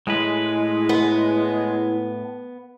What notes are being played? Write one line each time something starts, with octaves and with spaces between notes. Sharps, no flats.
A2 G#3 E4 B4
B3